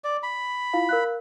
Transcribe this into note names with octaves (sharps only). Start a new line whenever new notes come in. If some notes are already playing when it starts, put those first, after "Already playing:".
D5
B5
E4 F4 F5
A#4 F5 F#6